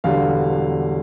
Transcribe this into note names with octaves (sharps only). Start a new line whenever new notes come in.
E1 E2 D3 G3 F5